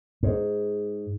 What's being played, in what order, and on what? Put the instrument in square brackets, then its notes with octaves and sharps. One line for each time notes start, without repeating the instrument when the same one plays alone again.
[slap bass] G#2